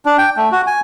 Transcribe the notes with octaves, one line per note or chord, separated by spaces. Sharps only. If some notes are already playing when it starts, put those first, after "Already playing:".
D4
G5
A3
F#4
G#5